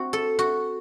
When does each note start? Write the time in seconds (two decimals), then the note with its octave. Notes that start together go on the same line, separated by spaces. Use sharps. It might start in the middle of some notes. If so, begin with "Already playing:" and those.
Already playing: C4 F#4
0.13 A4
0.39 F#4